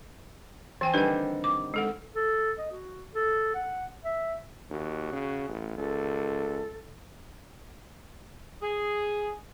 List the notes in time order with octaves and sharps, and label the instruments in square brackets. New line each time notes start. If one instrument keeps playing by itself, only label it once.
[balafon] E3 G5 G#5 [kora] C4
[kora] D3 D#3 G3 [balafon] B4 G#5
[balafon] D6
G#3 A4 F#5
[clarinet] A4
D#5
F#4
A4
F#5
E5
[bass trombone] D#2 [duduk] F#4
[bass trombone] C#3
A1
[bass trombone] C#2 [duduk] A4
[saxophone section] G#4